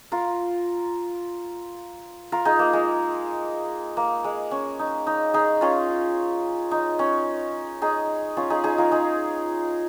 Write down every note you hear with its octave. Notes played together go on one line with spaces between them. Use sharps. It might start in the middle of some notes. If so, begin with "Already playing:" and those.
F4 A#4
F4 A#4
D#4 G#4
A#3
G#3
A#3
G#3
C#4
D#4
D#4
D#4 G#4
C#4 F4
D#4
C#4
D#4 G#4
C#4 F4
D#4 G#4
D#4 G#4
F4 A#4
D#4 G#4